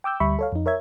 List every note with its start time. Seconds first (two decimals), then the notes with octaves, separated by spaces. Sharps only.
0.04 G5 D6 E6 G6
0.20 D2 G3 E5 B5 C#6
0.39 A4 C#5 F5
0.52 F2 D#4
0.66 A#4 C#5 E5 G#6